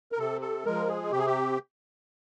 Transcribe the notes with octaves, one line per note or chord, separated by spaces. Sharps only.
A#4
C3 A4
A4
F3 G#3 A#4
G#4
C3 G4
G#4
G4